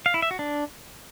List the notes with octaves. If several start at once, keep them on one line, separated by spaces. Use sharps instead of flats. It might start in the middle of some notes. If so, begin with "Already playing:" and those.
F5
E4
E5
F#4
D4